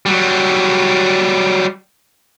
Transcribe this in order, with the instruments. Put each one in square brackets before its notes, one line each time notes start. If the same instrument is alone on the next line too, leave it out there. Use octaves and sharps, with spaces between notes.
[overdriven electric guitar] F#3 G3